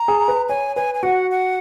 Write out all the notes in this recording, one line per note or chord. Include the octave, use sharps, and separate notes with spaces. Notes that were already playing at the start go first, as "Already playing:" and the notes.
Already playing: A#5
G#4
B4
C#5 G#5
B4 G#5
G#5
F#4 F#5
F#5